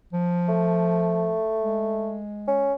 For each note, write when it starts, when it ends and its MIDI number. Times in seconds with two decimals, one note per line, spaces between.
0.13 1.38 53
0.48 2.20 57
1.60 2.75 56
2.48 2.74 61